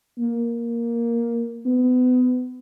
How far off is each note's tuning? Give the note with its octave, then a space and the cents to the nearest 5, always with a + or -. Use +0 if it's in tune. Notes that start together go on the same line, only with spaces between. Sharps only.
A#3 +5
B3 +30